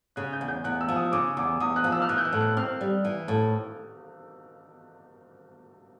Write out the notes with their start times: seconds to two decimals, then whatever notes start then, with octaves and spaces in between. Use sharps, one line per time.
0.16 C#3 F#6
0.33 G6
0.41 E2
0.48 G6
0.64 E2 F#6
0.81 E6
0.89 F3
0.96 D#6
1.12 C#3 D6
1.37 E2 D6
1.60 E2 D#6
1.76 F#6
1.84 F3
1.92 E6
2.02 F6
2.09 E3 F#6
2.18 G6
2.25 F#6
2.33 A2
2.41 F#6
2.57 C4 F6
2.81 G3
3.05 E3
3.28 A2